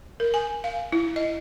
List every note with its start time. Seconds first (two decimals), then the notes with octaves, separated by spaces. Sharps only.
0.20 A#4
0.34 G#5
0.64 F5
0.92 E4
1.16 D#5